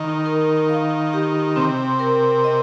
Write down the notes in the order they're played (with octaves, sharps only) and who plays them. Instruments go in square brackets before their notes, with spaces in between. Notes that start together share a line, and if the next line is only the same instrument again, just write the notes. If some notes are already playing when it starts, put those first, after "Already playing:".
Already playing: [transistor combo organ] D#3
[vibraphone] A#4
F5
G4
[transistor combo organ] C3 [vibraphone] C4
[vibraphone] A#4
D#5